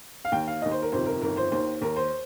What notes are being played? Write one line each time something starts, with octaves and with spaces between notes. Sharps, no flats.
F5
D#2 D#3 G5
F5
D#2 D#3 D#5
C5
A#4
G1 F2 C3 D#3 C5
A#4
G1 F2 D#3 A#4
C5
D#2 D#3 C5
D#2 D#3 A#4
C5